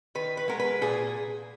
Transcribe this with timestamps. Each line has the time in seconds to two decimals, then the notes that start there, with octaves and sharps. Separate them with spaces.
0.15 D#3 B4
0.37 B4
0.48 G#3 B3 A#4
0.60 B4
0.81 A#2 G#4